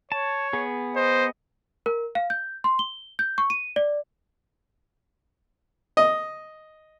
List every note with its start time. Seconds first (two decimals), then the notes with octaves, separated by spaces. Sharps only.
0.12 C#5 A5
0.53 B3 G#4
0.96 C5 D#5
1.86 A#4
2.15 F5
2.30 G6
2.64 C6
2.79 G7
3.19 G6
3.38 C#6
3.50 D#7
3.76 D5
5.97 D#5